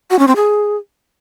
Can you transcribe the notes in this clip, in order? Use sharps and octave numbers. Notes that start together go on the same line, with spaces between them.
F#4
C#4
C4
G#4